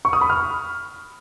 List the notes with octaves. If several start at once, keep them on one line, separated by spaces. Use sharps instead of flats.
C#6
D#6
B5
F6